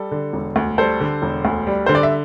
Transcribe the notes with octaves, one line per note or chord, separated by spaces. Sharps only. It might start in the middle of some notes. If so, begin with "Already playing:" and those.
Already playing: G3 A4
D3
E1
D2
G3 A4 C5
D3
E1
D2
G3
D3 C5
D5
E5